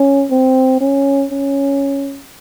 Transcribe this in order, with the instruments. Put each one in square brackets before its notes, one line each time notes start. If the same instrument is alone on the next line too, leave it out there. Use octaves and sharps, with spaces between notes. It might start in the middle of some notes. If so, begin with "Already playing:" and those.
Already playing: [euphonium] C#4
C4
C#4
C#4